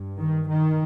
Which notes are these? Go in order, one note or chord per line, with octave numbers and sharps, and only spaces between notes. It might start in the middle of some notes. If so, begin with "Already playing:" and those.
Already playing: G2
D#3
D#3